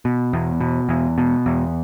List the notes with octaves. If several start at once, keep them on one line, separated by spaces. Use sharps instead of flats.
B2
E2
B2
E2
B2
E2